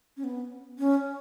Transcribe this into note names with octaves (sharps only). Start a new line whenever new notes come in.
C#4
B3
C#4